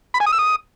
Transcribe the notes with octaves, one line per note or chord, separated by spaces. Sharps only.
B5
G#5
D#6
E6
D#6